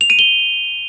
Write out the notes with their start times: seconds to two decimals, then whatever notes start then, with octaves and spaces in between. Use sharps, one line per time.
0.01 F7
0.10 D#7
0.19 G7